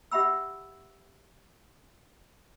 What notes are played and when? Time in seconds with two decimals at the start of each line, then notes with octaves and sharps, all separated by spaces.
0.11 G4 E5 F#5 B5 E6